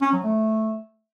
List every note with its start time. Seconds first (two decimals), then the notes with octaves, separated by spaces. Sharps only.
0.02 C#4
0.13 F#3
0.24 A3